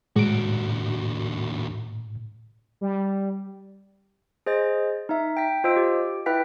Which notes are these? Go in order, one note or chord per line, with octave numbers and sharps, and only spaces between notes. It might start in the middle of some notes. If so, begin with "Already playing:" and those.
D#2 A2 G#3 F#4 D7
G3
G#4 C5 D#5 A6
D#4 E5
G5 B6
F4 C5 D#5 E6 D7
G4
E4 B4 E5 G5 B6